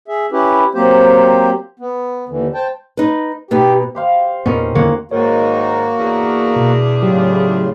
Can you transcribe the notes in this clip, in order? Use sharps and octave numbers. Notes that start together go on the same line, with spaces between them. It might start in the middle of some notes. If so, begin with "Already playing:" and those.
G#4 E5
C#4 E4 G4 B4
F#3 A#3 C4 G4 C5
B3
D#2 D3 E3
C5 G5 A5
D#4 B4
B2 B3 D#4 G4
G4 C5 F5
E2 A#2 B3 C#4 D#4 A#4
E2 D3 D#3 A#3 C#5 F#5
G#2 D#3 A#3 F#4 A#4 C#5
E2 D4 G#4
B2
A2 C#3 F#3 F4 G4